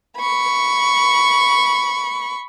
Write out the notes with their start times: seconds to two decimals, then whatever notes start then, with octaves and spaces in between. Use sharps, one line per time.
0.18 B5 C#6